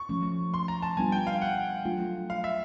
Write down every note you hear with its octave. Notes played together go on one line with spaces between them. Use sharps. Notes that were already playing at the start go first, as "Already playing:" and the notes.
Already playing: C#6
F3 A3 C#4
C6
A#5
A5
G3 B3 D4 F4 G#5
G5
F5
F#5
F#3 A3 D4 F4
F5
E5